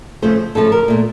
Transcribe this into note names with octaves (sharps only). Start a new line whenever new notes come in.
C#3 F3 A3 C5
C#3 F3 A3 A4
A#4
A#2 A3